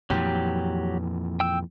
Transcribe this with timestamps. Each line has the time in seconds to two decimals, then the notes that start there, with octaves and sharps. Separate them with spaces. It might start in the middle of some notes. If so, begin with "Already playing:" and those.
0.10 F2 A#2 E3 F#3 G4
1.40 G5 E6